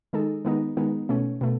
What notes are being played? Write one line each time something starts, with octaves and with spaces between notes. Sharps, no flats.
D#3 G#3 D#4 A4
D#3 G#3 B3 D#4
D#3 G#3 B3 D#4
B2 A3 C#4
B2 A3